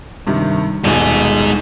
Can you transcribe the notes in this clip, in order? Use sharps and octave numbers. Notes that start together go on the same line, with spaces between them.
G2 C3 D#3
D#1 B2 G#3 D#4 G#5